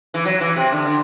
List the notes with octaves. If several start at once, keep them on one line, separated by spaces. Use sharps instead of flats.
E3
F#3
E3
C3
D3
D3